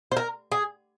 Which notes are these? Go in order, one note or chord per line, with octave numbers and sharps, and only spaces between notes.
C5
A#4
G#4